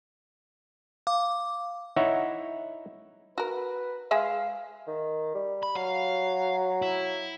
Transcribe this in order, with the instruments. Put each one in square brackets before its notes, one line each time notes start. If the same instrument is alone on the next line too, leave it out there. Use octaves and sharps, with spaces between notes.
[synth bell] F5 D6
[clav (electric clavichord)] D#4 E4 C#5 E5 F#5
[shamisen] F#4 A#4 [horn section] B4
[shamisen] G#3 G#4 E5 [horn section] F5
[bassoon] D#3
G3
[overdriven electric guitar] B5
[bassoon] F#3 [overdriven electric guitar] F5
[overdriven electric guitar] E4